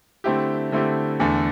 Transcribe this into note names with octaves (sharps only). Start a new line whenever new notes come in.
D3 A3 C4 E4 G4
D3 A3 C4 E4 G4
E2 D3 A3